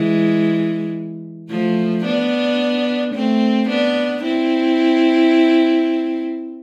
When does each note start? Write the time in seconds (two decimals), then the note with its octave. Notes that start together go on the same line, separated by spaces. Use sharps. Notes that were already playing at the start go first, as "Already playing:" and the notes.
Already playing: E3 G#3
1.50 F3 A3
2.05 B3 D4
3.14 A3 C4
3.69 B3 D4
4.24 C4 E4